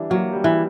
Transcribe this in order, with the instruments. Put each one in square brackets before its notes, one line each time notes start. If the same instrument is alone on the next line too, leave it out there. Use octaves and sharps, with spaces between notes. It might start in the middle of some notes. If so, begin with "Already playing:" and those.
Already playing: [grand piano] E3 G3 D4
[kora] F#3 [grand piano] A#3
[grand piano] G3
[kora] E3